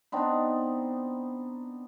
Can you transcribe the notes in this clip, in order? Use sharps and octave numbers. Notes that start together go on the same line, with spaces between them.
B3 C4 D4 D#4